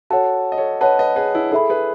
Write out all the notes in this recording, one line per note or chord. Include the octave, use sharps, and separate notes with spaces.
F#4 A4 C#5 F#5 A5
D#5
A4 C#5
B4 C#5 D#5 F#5 A5
B4 D#5
G#4 B4
E4
E4 G#4 A4 E5 B5
G#4 B4